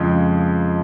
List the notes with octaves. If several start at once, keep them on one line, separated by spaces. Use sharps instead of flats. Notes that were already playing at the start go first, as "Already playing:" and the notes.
Already playing: F2 C#3 F3 G#3